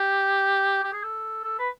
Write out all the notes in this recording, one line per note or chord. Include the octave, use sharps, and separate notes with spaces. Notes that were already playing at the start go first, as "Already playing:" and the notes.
Already playing: G4
G4
G#4
A4
A4
B4